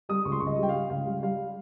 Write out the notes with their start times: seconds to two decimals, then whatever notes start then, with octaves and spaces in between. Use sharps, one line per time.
0.09 G3 D#6
0.25 C#2 C#6
0.32 C6
0.40 C#2 C#6
0.47 D#5
0.58 G3 G5
0.69 F5
0.75 G3
0.90 C#2 F5
1.07 G3
1.22 G3 F5